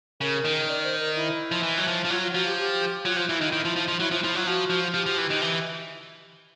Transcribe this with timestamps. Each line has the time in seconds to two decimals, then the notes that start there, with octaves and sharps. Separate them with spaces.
0.21 C#3 A#4
0.45 D#3
0.68 D5
0.84 C5
1.00 A#4
1.16 E4
1.51 F3
1.63 E3
1.78 F#3
1.87 F3
2.05 F3
2.10 F#3 F4
2.22 F4
2.34 F3 F#4
2.46 G4
2.58 G4
3.05 F#3 F4
3.16 F3 F4
3.29 E3 E4
3.40 D#3 D#4
3.47 F4
3.52 D#3 E4
3.65 F3
3.76 F3
3.88 F3
3.99 F#3 E4
4.11 F3 F4
4.23 F3 E4
4.35 F#3 F4
4.47 F3 F#4
4.70 F3
4.94 F3 G4
5.06 F3
5.18 E3
5.30 D#3
5.41 E3